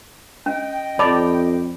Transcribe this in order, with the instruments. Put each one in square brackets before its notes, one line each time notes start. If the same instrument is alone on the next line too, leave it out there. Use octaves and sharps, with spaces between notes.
[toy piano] C#4 [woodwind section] D#5 G5
[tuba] F2 [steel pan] D5 A5 [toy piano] B5 D6